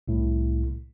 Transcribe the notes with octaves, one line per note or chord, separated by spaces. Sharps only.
C2 A2